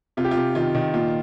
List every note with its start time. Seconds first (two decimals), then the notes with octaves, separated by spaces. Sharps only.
0.17 C3 F4
0.25 G4
0.31 F4
0.37 C3
0.55 D#3 F4
0.75 D#3
0.94 A#2 F4